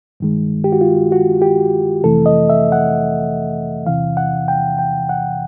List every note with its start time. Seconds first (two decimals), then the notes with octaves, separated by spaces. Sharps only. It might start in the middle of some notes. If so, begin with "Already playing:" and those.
0.20 G2 D#3 G#3
0.64 G4
0.72 F#4
0.81 F4
1.12 F#4
1.42 G4
2.03 F2 C3 E3 A3 A4
2.26 D#5
2.50 E5
2.72 F#5
3.87 E2 C3 E3 F5
4.17 F#5
4.48 G5
4.79 G5
5.09 F#5